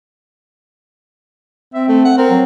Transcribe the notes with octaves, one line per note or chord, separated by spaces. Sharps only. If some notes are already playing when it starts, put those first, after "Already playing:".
C4 E5
A3
F#5
C4 A#4
F#3